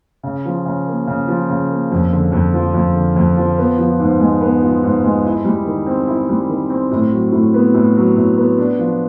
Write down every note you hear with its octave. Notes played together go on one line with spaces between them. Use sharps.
C#3
F3
C#3
A#3
C#3
F3
C#3
A#3
F2
D3
F2
F3
F2
D3
F2
F3
B3
F3
G#2
G#3
B3
F3
G#2
G#3
E4
G3
D#3
C4
E4
G3
D#3
C4
A2
F#3
A2
B3
A2
F#3
A2
B3
D4
F3